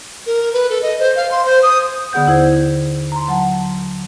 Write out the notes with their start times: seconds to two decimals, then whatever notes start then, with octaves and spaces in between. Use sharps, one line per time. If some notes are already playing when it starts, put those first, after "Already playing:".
0.26 A#4
0.53 B4
0.70 A4
0.82 D#5
0.99 C5
1.16 F5
1.31 C6
1.45 C5
1.63 D#6
2.13 D3 B3 G#4 F#5 G6
2.27 D#2 E4 C5 G#6
3.12 A#5 C6
3.28 F#3 F#5 A5